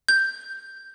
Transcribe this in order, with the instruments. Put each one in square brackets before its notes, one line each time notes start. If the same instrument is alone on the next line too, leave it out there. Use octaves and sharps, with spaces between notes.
[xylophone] G6